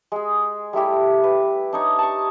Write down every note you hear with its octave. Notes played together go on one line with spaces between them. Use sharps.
G#3 G#4
G3 A3 E4 G4
B4
D4 D#4 C#5
A5 C#6